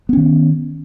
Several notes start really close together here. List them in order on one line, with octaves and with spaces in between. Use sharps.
B3 C#4 D#3